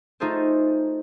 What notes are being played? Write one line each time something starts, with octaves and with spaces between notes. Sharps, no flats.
A3 D#4 F4 G#4 A4 C5